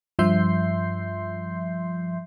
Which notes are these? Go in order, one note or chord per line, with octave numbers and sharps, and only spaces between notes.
G2 F3 E5 C6 G6 C7